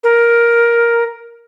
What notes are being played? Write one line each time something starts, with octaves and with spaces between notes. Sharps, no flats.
A#4